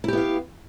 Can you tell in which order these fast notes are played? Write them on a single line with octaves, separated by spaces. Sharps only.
E4 G4 B3 F5